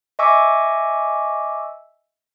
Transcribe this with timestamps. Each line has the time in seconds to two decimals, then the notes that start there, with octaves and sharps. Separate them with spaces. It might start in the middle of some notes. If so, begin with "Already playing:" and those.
0.19 D#5 E5 G#5 C#6 D6 E6